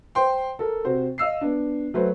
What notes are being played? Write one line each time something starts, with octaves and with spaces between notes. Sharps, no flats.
C5 G5 C6
A4 A#4
C3 F#4 C5
D#5 F5 E6 C7
B3 D4
F#3 A3 F#4 B4 C5